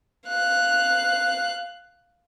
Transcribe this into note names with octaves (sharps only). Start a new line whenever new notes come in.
F5 F#6